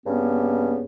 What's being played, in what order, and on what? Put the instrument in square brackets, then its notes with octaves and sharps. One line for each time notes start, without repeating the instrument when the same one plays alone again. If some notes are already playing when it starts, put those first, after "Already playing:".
[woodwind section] G2 C#3 A#3 B3 C#4